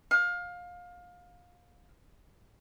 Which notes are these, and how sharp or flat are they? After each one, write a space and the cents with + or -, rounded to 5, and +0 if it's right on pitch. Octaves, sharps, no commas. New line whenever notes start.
F5 +25